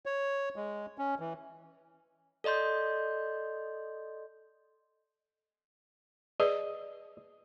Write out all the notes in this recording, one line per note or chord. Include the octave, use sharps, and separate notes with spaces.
C#5
G#3
C#4
E3
A4 D5 D#5 C6 G6
G#4 B4 D5 D#5